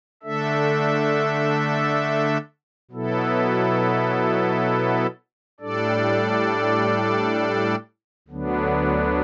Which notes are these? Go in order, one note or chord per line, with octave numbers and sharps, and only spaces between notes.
D3 A3 D4 A4 E5
B2 F#3 B3 E4 A4
A2 G3 D4 A4 D5
D2 D3 F#3 B3 D4